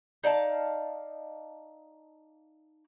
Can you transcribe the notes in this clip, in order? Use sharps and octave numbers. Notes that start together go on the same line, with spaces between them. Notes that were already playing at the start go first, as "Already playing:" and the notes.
D#4 D5 F5 A5